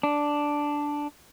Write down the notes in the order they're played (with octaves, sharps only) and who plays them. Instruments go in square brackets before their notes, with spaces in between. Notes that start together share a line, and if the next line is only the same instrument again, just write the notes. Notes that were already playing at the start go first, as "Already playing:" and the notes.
[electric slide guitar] D4